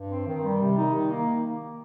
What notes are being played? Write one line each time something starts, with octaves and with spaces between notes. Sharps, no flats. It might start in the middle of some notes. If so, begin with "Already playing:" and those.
Already playing: G2
C4
D#3
G3
C3
D#4
D#3
A#3